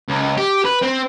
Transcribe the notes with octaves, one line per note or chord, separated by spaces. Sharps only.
C#2
G4
B4
C4